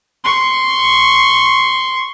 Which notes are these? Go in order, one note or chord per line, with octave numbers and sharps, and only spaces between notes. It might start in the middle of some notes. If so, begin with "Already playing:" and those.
C6 C#6